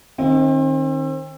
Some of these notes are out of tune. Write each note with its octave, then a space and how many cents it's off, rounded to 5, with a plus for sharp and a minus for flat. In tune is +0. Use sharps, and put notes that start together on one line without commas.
D#3 -10 C4 +35 D#5 +25